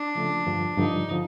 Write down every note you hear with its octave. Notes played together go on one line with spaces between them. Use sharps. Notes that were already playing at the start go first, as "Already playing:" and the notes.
Already playing: D4
C#3 F3 A3
G2 D3 F3
G2 D3 F3 D#4
D3 F3